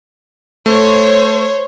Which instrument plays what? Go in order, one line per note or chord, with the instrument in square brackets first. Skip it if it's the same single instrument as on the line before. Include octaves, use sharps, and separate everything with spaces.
[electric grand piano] A3 [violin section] C5 C#5